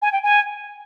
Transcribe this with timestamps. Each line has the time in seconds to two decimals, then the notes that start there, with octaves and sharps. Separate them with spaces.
0.02 G#5
0.12 G5
0.22 G#5